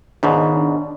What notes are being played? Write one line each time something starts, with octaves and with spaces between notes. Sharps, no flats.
C#2 G#2 B2 D#3 D4